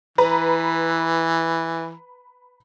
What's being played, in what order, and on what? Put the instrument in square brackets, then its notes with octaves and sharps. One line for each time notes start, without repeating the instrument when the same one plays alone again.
[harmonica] E3 [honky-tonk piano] B4 A#5